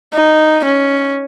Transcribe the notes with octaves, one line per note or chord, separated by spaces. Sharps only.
D#4
C#4